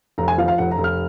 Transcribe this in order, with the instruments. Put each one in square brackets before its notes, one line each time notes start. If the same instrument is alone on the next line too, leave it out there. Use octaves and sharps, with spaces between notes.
[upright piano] F1 A#5
G#5
F3 F5
F5
F1 F#5
A#5
F1
F6